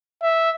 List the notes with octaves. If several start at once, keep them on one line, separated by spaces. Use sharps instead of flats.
E5